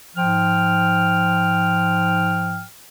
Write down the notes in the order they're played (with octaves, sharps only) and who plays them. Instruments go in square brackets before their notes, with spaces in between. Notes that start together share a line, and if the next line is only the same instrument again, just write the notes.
[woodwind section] G#2 F3 G5 F6